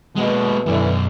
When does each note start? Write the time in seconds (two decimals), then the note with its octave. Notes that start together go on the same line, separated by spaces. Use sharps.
0.16 B2 G#3 A#3
0.66 F#2 B2 D3 E3